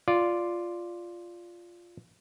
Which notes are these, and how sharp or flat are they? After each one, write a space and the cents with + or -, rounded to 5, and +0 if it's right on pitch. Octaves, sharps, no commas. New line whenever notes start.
F4 +0 D5 +0